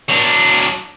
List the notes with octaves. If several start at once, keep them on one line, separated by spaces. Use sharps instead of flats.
F#3 D4